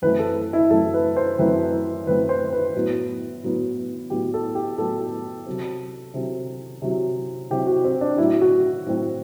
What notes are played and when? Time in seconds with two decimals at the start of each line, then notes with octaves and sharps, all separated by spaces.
0.02 F#2 E3 A3 C4 B4
0.19 A4
0.53 E4
0.70 F#2 E3 A3 C4 A4
0.94 B4
1.17 C5
1.39 F#2 E3 A3 C4 B4
2.06 F#2 E3 A3 C4 B4
2.29 C5
2.52 B4
2.74 A2 F#3 B3
3.43 A2 F#3 B3
4.10 A2 F#3 B3 G4
4.34 A4
4.55 G4
4.78 A2 F#3 B3 A4
5.46 C3 F#3 C4
6.14 C3 F#3 C4
6.82 C3 F#3 C4
7.50 C3 F#3 C4 G4
7.67 F#4
7.84 C4
8.01 D4
8.18 A2 F#3 C4 E4
8.42 F#4
8.87 A2 F#3 C4